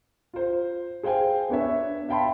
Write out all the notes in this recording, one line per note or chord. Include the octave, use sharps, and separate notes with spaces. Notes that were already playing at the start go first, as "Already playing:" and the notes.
F4 C5
G#4 C5 F5 G5 G#5
B3 D4 C#5 E5
E5 F5 G5 A5 B5 C6